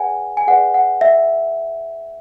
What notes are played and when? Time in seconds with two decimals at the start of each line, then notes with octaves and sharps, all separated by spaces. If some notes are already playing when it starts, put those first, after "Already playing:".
Already playing: G#4 B4 D5 F#5 G#5
0.37 G#5
0.47 G#4 B4 D5 F#5
0.74 F#5
1.01 E5